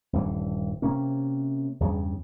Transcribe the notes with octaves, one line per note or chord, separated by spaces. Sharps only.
D#1 G2 E3
C3 A#3 C#4
E2 G2 C#3